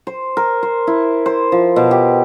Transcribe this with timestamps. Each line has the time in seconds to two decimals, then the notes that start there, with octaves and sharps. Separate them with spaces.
0.07 C5
0.37 A#4
0.63 C5
0.87 E4
1.26 C5
1.52 F3
1.76 B2
1.91 G4